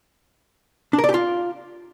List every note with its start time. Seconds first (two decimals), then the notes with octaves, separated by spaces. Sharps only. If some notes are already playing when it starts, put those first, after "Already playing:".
0.93 D4
0.98 A#4
1.04 D5
1.09 G4
1.14 F4